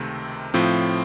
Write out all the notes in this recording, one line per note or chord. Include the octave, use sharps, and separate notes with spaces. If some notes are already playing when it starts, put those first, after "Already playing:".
Already playing: C#2 C3 D#3 A3 C4
A2 F3 C4 F4